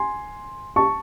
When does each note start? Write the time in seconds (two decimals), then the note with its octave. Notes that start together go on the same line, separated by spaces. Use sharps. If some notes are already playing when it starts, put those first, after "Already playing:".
Already playing: G#5 C6
0.76 A5 C#6